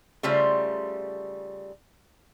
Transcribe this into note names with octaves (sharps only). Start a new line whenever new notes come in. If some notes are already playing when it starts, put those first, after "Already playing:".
C#3 G3 A3 F4 C5